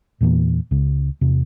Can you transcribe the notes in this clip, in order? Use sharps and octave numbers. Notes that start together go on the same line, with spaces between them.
E2 A#2 E3 A#3
C#2 C#3
E2 C3